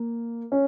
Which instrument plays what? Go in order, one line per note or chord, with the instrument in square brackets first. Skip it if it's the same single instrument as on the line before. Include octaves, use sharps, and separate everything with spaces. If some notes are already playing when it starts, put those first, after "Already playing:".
Already playing: [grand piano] A#3
C#4